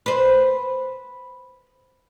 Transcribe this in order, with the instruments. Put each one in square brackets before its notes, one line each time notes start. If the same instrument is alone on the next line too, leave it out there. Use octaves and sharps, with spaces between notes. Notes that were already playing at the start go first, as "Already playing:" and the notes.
[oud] B4 C5